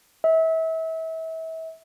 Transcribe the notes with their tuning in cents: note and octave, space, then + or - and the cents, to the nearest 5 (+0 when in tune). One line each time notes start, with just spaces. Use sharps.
E5 -35